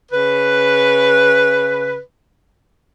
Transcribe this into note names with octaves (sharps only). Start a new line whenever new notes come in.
C#3 B4